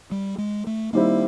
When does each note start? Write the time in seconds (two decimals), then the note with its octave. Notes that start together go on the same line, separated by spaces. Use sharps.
0.11 G3
0.38 G#3
0.67 A3
0.93 D#3 G3 A#3 C4 E4